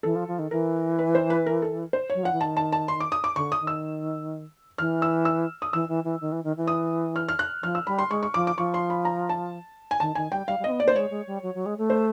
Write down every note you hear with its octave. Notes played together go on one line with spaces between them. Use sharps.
E3 A4
F3
F3
D#3
E3 A#4
B4
C5
B4
A#4
A4
C5
F#3 C#5
F3 F#5
E3
D#3 A5
A5
A5
C6
D6
D#6
D6
D3 C#6
D#6
D#3
E6
E3 F6
E6
E6
D#6
E3 E6
E3
E3
D#3
E3
D#3
E3
D#6
F6
F6
F#6
F3 F6
E6
G3 B5
C6
G#3 C#6
C#6
F3 D6
D6
F3 C#6
C6
B5
A#5
A5
G#5
D#3 A5
D#3 G#5
G3 G5
G3 F5
G3
C4 D#5
B3
A#3 D5
C5
G#3 C#5
G#3
G3
F#3
F#3
G#3
A3
C5